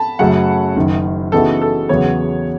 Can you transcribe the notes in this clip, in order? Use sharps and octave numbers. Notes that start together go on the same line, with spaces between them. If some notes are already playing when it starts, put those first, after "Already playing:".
Already playing: A5 B5
F#2 C#3 F#3 A3 F#5
F#1 F#2 D#3
C#3 E3 B3 D#4 F#4 A4
A4
E2 C#3 F#3 B3 C#5